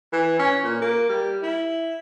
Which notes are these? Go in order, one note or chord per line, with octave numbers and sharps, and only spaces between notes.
E3
C#4
A#2
A#3
G3
E4